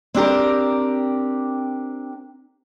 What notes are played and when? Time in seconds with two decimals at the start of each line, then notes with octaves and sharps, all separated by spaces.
0.15 C4 D4 G4 A#4